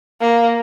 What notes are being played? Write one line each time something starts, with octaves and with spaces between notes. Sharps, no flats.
A#3